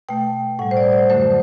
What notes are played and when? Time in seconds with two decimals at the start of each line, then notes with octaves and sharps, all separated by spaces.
0.09 B2 A3 G5
0.59 A2 F#5
0.62 G3
0.71 C5
0.77 D5
0.93 C5
1.10 F#2 D3 F#3 A3 C5